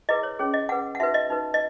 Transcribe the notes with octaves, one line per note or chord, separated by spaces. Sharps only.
E4 G#4 B4 D#5
C#5
C#4 G#4 C#5
D#5
C#4 G#4 B4 F#5
F#5
D#4 F#4 B4 E5
D#5
D#4 F#4 B4
D#5